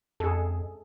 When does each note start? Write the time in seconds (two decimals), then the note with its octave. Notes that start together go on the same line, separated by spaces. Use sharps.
0.20 F2 G#4 A4